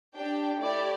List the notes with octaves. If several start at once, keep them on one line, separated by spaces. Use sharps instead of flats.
D4 G4 G5
A3 E4 G4 D5